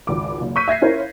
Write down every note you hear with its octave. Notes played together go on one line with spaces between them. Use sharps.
G#1 C#2 D6
F#1
C#6 E6 F#6 G6 B6 D#7
E5 G#6 A#6 C7
C#4 E4 F4 A#4 C5 C#5